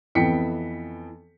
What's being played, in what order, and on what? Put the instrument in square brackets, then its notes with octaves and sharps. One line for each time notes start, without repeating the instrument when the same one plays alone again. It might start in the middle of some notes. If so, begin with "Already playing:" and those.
[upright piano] F2 E3 B3 G5 B6 C#7